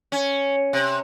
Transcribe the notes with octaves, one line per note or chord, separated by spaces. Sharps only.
C#4
C3